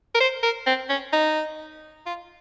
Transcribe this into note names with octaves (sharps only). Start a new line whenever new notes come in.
A#4
C5
A#4
C4
C#4
D#4
F4